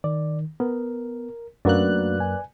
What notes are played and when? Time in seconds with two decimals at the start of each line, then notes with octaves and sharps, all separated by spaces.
0.04 D#3 D5
0.60 B3 A#4
1.65 F#2 A3 A#3 D4 F#4 B4 D5 F#6
2.20 G#5